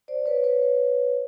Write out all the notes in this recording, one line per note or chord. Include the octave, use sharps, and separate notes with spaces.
C5 D5
B4 C#5
B4 C#5